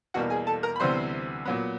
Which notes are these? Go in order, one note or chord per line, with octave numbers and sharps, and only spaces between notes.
E2 B2 G3 A#3 F#4 F#5
G#4 G#5
A4 A5
A#4 A#5
B5
D2 C3 E3 G3 B3 C5 C6
A#2 F#3 B3